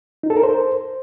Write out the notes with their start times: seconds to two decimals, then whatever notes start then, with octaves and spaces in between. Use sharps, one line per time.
0.23 D#4
0.30 A4
0.37 A#4
0.43 C5